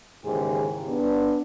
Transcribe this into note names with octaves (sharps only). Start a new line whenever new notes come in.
D#2 G#2 C#3 E3 G4 G#4
B3 D4